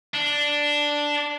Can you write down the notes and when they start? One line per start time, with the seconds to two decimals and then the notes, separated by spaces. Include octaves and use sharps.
0.14 D4